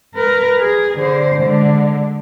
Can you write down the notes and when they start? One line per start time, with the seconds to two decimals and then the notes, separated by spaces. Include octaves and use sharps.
0.15 A#4 B4
0.59 G#4
0.98 D3 C5
1.42 D3 G#3